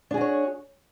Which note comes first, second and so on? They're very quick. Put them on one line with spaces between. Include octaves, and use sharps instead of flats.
D4 G#4 F#4 C#5